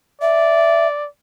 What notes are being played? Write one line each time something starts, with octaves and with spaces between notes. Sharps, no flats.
D5 E5